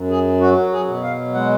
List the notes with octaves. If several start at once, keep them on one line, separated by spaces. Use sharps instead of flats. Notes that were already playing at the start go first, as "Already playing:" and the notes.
Already playing: F#2
G#4
F#3 F#4
G#4
B2
F5
G#3 F#5